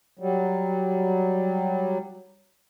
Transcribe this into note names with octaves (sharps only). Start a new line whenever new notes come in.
F#3 G3